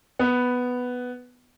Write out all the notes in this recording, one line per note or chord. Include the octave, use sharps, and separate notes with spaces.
B3